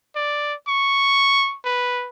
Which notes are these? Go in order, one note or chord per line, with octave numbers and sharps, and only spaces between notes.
D5
C#6
B4